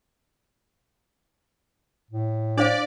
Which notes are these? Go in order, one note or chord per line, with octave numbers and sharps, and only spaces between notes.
A2
D4 C5 D5 F5